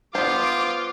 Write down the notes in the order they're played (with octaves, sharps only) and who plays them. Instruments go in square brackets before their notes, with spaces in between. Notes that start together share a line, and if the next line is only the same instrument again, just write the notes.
[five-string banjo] B3 C5 [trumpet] F4 [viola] D6